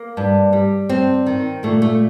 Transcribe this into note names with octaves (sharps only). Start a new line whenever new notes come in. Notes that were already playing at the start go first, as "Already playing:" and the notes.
Already playing: A#3
G2
G3
G2 C4
D#3
A#2 A3
A3